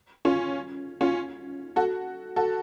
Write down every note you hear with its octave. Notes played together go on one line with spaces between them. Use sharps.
C#4 F4
C#4 F4
F#4 A4
F#4 A4